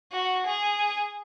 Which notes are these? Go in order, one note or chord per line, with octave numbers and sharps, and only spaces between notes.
F#4
G#4